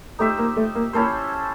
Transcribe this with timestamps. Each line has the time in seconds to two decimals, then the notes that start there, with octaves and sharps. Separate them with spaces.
0.19 A3 D#4 G4 C5 E5
0.38 A#3
0.56 A3
0.75 A#3
0.93 A#3 C#4 E4 A4 C5